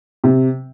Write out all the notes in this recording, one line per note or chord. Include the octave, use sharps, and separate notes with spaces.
C3